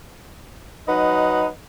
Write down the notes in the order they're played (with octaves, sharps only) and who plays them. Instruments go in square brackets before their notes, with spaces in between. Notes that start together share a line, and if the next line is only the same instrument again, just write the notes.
[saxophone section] F#3 D#4 B4 D#5 F#5